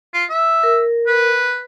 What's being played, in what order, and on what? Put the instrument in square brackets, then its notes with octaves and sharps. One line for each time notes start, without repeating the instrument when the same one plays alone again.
[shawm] F4
E5
[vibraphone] A#4
[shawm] B4